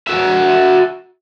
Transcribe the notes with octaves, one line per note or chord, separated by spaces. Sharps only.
F#4 E5